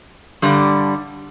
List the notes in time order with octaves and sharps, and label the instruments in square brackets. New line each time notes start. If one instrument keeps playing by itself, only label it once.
[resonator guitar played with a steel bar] G2 D3 G3